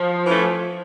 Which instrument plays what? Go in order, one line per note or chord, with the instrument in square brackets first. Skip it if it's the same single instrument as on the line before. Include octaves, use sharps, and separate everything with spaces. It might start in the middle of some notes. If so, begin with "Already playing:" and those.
Already playing: [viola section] F3
[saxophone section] E3 A3 C#4